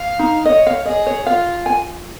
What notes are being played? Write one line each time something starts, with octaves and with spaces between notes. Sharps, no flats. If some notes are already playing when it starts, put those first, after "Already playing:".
Already playing: F5
D#4
C#5 D#5
F5
G#4 D#5
C#5
F4 F5
G#5